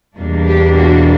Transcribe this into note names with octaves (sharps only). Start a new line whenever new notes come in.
E2 B2 G3 A#3 D4
G4
F#4